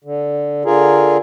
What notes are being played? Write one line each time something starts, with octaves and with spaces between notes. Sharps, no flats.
D3
D3 F4 G#4 A#4